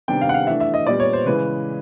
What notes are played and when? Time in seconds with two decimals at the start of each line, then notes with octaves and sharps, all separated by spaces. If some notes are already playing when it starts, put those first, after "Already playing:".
0.08 C3 D#3 G3 B3 D4 G5
0.21 F5
0.29 F#5
0.34 F5
0.47 E3 A3 D4 E5
0.60 E5
0.74 D#5
0.87 A#2 G3 B3 D5
1.00 C#5
1.13 C5
1.26 C#3 E3 G#3 B4